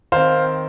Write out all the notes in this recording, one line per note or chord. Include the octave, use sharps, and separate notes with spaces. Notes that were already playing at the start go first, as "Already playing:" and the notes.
D#3 C4 C5 F5